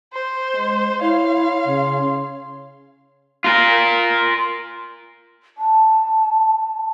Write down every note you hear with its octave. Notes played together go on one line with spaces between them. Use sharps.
C5 C6
G#3
E4 C#5 F5
C#3
F4 A#4
A5